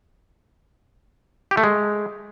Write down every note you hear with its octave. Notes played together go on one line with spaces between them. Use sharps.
G4
A3
G#3